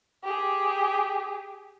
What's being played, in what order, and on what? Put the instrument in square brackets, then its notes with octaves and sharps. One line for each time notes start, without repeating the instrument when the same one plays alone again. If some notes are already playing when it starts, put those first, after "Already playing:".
[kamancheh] G4 G#4